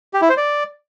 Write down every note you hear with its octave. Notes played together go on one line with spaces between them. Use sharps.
G4
E4
C5
D5